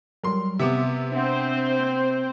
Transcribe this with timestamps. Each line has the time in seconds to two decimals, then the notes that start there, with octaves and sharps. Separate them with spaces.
0.24 F#3 G3 A#4 C6
0.59 C3 B3 G4 E5 D6
1.12 C4 D4 C5 F#5
1.80 A#3 G6